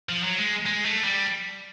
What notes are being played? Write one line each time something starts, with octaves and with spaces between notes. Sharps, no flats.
F3
F#3
G#3
G#3
A3
G3